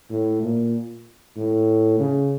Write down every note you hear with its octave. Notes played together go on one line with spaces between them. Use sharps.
A2
A#2
A2
C#3